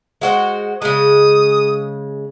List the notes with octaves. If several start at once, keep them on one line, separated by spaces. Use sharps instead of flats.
G#3 F#4 C5
C#3 G#3 D#6